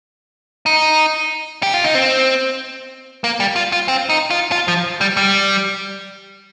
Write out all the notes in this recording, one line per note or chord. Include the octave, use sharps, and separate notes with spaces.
D#4
G4
F4
D#4
C4
A#3
G3
F4
F4
C4
D#4
F4
F4
F3
G3
G3